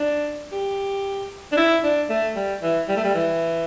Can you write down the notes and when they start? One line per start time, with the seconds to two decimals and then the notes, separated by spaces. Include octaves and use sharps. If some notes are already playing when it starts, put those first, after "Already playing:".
Already playing: D4
0.52 G4
1.52 D4
1.57 E4
1.83 D4
2.09 A3
2.36 G3
2.62 E3
2.89 G3
2.96 A3
3.04 G3
3.14 E3